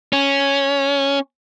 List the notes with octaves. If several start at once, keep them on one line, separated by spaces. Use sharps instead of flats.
C#4